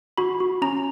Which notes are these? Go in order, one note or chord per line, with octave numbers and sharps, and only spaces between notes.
F#4 B5
F#4
C#4 A#5